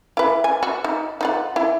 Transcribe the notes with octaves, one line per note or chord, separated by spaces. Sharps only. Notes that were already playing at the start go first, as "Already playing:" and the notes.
E4 B4
G#5
F#4
D#4
D#4 F4 F#5
E4